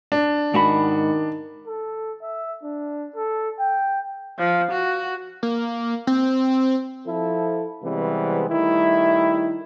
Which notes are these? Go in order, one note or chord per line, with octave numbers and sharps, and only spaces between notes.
D4
G#2 D#3 F#4 B5
A4
E5
D4
A4
G5
F3
F#4
A#3
C4
F3 E4 A4
C3 E3 G3 G#3 B3 C4
D#3 G3 A3 E4